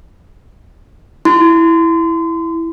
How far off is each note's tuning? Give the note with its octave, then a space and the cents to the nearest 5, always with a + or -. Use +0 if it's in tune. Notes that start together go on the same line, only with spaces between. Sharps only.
E4 +0 C6 -30